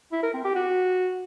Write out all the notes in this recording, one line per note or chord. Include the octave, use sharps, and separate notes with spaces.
E4
A#4
C4
G4
F#4